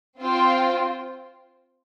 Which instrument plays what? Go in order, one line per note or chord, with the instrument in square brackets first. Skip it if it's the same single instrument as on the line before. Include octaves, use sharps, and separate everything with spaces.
[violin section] C4 F4 C5 G5